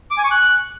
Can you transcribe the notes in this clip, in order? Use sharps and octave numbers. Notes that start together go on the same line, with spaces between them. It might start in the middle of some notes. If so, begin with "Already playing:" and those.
D6
G#5
C#6
F#6